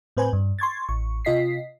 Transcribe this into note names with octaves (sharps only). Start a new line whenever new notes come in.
A2 C4 B4 C5 G#5
G2
C6 C#6 G#6 A6
A1 C#6
C3 F4 D#5 B6 C7